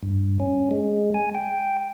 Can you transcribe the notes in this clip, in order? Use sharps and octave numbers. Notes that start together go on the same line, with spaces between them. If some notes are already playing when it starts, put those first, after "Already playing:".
G2
C#4
G#3
G#5
G5